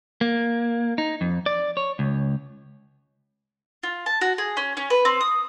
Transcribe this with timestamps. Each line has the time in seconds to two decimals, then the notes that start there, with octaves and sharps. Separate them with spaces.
0.21 A#3
0.98 D#4
1.21 F2
1.46 D5
1.77 C#5
1.99 C#2
3.83 F4
4.06 A5
4.21 F#4
4.38 G#4
4.57 C#4
4.77 C#4
4.90 B4
5.05 C4
5.21 D#6